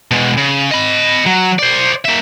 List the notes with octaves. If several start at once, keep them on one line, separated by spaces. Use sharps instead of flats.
B2 G#3
C#3
D#5 B5
F#3
C5 D5
A#3 E5